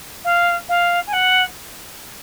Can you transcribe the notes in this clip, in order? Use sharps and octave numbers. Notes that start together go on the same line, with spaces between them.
F5
F5
G#5
F#5